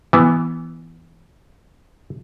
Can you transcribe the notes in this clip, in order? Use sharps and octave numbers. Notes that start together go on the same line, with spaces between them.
E3 B3